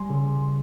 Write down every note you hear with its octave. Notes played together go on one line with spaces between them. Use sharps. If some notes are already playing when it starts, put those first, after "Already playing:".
Already playing: G3 G#5 C6
C#3